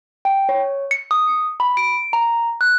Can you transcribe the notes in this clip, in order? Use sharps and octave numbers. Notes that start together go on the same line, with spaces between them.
G5
C#5
C#7
D#6
B5
D7
A#5
F#6